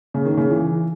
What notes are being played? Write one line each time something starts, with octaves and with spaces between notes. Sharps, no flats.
C#3
D#3
C#3
E3